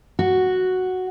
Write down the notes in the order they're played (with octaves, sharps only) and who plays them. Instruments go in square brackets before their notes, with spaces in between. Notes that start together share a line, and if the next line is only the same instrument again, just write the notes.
[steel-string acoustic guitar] F#4